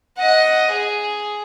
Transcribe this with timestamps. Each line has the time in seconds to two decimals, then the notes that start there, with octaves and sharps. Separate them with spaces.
0.17 D#5 F#5
0.71 G#4